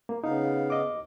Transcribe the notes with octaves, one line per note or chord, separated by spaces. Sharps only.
A#3
C#3 B3 D#4 F5
D#5 D6
D#2